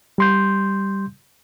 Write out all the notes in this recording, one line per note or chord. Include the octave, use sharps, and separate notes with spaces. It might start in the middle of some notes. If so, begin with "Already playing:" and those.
G3 C6 G6